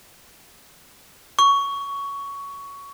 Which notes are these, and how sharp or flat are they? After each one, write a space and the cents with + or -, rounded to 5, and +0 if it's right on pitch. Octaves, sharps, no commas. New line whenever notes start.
C#6 +15